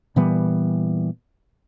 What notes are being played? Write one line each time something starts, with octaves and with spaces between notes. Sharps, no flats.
A#2 E3 G3 B3